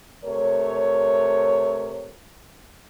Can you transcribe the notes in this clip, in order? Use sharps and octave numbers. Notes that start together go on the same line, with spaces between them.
C3 A3 A#4 C#5